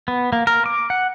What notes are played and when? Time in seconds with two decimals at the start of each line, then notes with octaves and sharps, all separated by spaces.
0.08 B3
0.33 A#3
0.47 A#4
0.66 D6
0.90 F#5